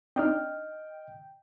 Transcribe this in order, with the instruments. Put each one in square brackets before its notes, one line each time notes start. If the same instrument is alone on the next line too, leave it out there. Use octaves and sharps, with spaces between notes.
[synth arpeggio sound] C4 D4 D#4 [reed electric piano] D#5 F6 [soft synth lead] G5